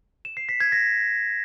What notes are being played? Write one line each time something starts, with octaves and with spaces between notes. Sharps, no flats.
E7
C7
B6
G#6
A#6